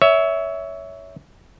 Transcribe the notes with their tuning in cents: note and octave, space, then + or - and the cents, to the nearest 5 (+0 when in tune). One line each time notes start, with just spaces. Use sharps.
C#5 +20 E5 -10